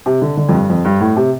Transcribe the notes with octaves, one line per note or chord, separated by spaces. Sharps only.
C3
D3
D3
F2
G2
F2
G2
A2
C3